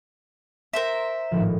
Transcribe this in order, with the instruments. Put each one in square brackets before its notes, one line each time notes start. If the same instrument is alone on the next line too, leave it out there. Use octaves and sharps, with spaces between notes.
[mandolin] A#4 C5 E5 [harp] C6 C7
[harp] G#1 A2 F3